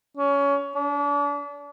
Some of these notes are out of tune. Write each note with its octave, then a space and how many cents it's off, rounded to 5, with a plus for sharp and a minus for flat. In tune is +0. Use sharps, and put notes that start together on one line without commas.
C#4 +20
D4 -35